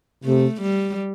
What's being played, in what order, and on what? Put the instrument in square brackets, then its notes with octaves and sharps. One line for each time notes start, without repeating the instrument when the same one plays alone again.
[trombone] C3 [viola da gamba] A3
[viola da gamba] G3